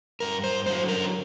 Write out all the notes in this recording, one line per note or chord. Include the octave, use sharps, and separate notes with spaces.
G2 A#4
C5
D3 F#3 C5
A#4